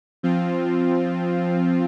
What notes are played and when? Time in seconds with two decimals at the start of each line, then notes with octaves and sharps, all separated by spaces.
0.23 F3 C4 F4